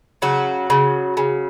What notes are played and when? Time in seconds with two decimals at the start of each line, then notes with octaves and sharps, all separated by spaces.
0.22 C#3 F#3 F#4
0.70 C#3
1.17 C#3